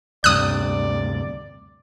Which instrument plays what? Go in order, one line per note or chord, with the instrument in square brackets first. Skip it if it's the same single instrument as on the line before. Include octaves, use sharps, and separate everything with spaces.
[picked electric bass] D2 G2 C3 [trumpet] D5 [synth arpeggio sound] D#6 F#6